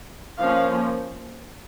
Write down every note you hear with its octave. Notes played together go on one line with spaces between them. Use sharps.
F3 A#3 C#4 F5